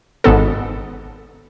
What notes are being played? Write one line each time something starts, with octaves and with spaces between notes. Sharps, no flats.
G#1 G#2 B3 A4